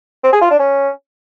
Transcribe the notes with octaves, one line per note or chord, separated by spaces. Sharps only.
C4
G#4
F4
D4
C#4